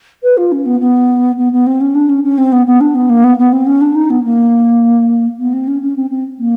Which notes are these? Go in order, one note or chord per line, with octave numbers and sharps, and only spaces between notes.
B4
F4
C#4
B3
B3
B3
B3
C4
C#4
D4
C#4
C#4
C4
B3
B3
D4
B3
A#3
B3
B3
C4
C#4
D4
D#4
B3
A#3
B3
C4
C#4
C#4
C4
C4
A#3